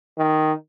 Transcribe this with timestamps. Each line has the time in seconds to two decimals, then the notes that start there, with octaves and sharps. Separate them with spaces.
0.18 D#3